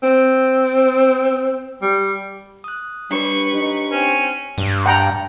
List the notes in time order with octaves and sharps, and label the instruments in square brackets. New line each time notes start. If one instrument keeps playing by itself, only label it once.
[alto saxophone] C4
G3
[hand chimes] D#6 F#6
[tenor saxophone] G3 [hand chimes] D4 G4 C#5 [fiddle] B4 C#6
[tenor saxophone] D#4
[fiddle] C4 [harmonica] C#4
[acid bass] G2
[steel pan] F#5 G5 A#5